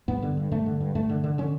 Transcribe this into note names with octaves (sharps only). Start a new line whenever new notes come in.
G2 B3
D3
G2
G2 A3
D3
G2
G2 A3
D3
D3
D3 C#4